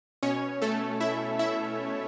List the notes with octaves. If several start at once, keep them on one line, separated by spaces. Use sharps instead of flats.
B2 C#4 C#5
A3 A4
E4 E5
E4 E5